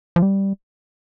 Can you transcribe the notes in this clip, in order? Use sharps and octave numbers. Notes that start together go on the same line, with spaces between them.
F3
G3